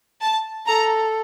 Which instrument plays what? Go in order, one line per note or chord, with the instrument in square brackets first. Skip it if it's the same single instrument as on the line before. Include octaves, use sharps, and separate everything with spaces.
[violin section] A5
[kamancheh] A4 [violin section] A#5